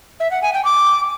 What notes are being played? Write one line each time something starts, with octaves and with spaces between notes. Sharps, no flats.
E5
F#5
G#5
G5
D6